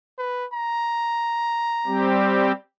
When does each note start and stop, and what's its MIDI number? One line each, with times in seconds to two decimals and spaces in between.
0.18 0.45 71
0.53 2.14 82
1.87 2.52 55
1.87 2.52 60
1.87 2.52 67